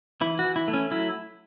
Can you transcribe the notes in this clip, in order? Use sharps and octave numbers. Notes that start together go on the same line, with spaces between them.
E3 E4
F#4
E3
E4
A3
C#4
F#3 E4